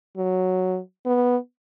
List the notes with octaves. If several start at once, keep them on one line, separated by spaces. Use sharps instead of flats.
F#3
B3